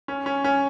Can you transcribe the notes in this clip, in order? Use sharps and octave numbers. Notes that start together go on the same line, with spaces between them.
C#4
C#4
C#4